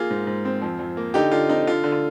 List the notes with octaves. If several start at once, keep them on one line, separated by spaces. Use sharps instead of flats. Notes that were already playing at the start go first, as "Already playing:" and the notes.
Already playing: A#3 F4 G#4
G#2
G#2
C4
F2
F2
A#3
D3 D#4 G4
D3 F4
C4 D#4
D3 F4
D3
F4